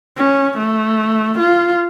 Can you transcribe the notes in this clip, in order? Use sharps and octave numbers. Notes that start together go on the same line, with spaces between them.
C#4
A3
F4